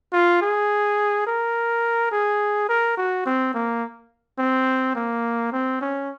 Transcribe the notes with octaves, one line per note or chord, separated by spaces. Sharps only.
F4
G#4
A#4
G#4
A#4
F#4
C4
A#3
C4
A#3
C4
C#4